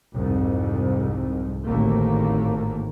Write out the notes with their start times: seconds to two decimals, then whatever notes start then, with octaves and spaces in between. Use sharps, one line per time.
0.14 C2 F2 G#2
1.64 G#1 D#2 A2 D3 A3 A#3